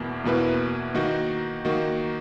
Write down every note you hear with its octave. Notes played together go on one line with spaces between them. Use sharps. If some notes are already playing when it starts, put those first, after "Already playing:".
Already playing: E2 B2 A#3 E4
E2 B2 A#3 E4 B4
D#3 A#3 D#4 F#4
D#3 A#3 D#4 F#4